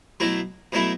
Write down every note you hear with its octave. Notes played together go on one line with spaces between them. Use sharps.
B2 F#3 A3 E4
B2 F#3 A3 E4